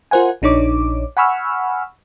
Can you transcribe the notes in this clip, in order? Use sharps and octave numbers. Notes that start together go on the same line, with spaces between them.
F4 A#4 C5 F#5 G#5
A#1 D4 D#4 C#5 D6
F#5 G#5 B5 C#6 E6 F6